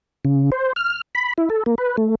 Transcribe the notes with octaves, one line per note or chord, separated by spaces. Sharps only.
C#3
C5
F6
B5
E4
A4
A#3
B4
A3